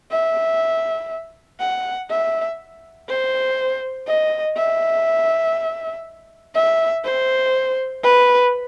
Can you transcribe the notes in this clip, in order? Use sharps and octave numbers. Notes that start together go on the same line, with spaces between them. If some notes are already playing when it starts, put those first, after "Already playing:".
E5
F#5
E5
C5
D#5
E5
E5
C5
B4